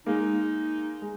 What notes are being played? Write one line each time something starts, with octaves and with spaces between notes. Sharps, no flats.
G#3 A#3 D#4
G#3